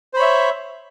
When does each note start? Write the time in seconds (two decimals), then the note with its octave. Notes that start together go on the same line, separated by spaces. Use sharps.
0.14 C5
0.16 B5
0.19 C#5
0.22 E5